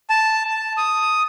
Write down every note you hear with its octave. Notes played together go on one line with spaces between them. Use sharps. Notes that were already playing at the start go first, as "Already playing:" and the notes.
A5
A5
D#6